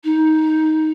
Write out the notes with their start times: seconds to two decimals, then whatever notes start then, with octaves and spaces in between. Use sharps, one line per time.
0.04 D#4